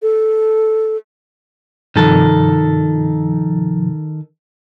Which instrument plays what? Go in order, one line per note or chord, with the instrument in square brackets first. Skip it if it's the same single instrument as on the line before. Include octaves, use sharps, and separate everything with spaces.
[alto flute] A4
[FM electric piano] G2 C3 F3 [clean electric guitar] D#3 A4